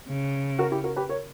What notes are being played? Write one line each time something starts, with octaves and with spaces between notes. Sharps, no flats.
C#3
F#4 A#4
E4 G4
F#4 A#4
G4 B4
A#4 C#5